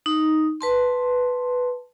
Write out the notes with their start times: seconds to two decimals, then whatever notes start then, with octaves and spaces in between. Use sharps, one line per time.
0.06 D#4
0.61 B4 A5 C6